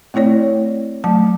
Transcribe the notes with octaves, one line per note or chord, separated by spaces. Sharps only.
A3 C4 E4 C#5 D5
F#3 A3 A5